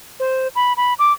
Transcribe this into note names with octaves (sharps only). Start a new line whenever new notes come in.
C5
B5
B5
D6